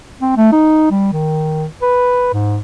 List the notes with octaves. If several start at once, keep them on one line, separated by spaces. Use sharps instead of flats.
C4
A3
D#4
G3
D#3
B4
G#2